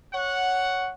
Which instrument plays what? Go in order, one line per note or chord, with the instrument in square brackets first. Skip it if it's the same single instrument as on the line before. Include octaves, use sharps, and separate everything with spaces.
[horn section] C#5 F#5